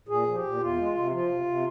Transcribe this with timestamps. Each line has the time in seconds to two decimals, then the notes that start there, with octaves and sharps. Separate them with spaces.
0.08 A#2 G#4
0.26 F3
0.35 G4
0.43 A#2
0.60 E2 F4
0.77 G#3
0.95 C3
1.11 F3 F4
1.29 C3
1.46 C3